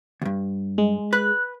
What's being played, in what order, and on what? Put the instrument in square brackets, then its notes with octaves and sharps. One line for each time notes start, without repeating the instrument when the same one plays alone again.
[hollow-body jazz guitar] D2 G2
[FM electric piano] G#3
[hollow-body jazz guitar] B4 [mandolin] F#6